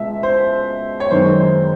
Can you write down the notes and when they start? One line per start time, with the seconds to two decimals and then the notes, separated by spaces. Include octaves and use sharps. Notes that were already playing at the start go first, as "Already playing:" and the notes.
Already playing: C#2 B2 G#3 E5
0.23 C5
1.00 C#5
1.11 F#2 D#3 G#3 B3 C5
1.40 C5